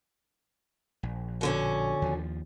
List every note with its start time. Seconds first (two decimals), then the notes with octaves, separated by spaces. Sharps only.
1.03 A#1
1.41 B2 D3 C#4
2.02 D#2 F3